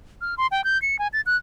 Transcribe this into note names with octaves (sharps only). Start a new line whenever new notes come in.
F6
C6
G5
G6
C#7
G#5
A6
F#6